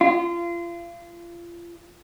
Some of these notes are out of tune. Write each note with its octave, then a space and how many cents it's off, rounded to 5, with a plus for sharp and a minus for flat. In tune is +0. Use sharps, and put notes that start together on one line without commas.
F4 -30